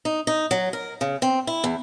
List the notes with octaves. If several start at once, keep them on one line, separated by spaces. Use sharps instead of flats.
D#4
D#4
F#3
A#4
C#3
C4
E4
E2